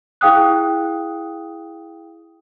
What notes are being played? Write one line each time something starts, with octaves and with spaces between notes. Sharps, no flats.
E4 G#4 F5 G5 D#6 F#6